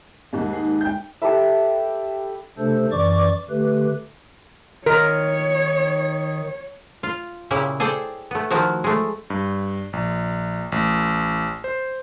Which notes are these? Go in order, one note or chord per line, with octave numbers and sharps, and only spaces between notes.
D#2 G#2
G#3 D#4
G5 G6
G4 A4 B4 E5
C3 A3 D4 A4 C5
F#2 E3 D5 C#6 D6
D3 A3 G4 B4
D#3 A#4 C#5
F4
A#2 C#3 E4 G4
G#4 A4 C5 D5 G5
A3 B3
D#3 F3 E4 F#4
G#3 A3
G2
A#1
A1
C5